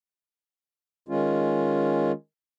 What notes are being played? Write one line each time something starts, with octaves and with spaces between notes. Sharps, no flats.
D#3 G#3 C#4 F4